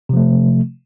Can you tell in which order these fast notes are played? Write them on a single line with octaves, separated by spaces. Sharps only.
C3 F3 A3